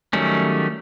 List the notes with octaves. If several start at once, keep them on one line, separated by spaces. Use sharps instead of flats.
D#3 F#3 G3 A3 C#4